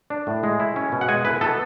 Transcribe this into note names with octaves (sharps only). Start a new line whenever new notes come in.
D4
A2
G#3
E4
C#4
B2
F#5
G#3 G#5
E4 B4
B3 A4